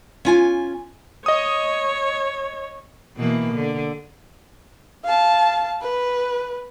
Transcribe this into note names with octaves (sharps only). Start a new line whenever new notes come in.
C#4 F4 G#5
C#5 D#5 D#6
B2 E3 A#3
D3
F5 A5
B4